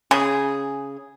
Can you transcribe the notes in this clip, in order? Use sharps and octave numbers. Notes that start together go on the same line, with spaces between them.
C#3 G#4